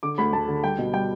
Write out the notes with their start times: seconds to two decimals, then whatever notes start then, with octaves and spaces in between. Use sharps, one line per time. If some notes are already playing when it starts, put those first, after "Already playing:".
0.03 D3 D6
0.18 D2 B5
0.33 D2 A5
0.48 D3
0.64 G3 G5
0.78 B2
0.93 G3 G5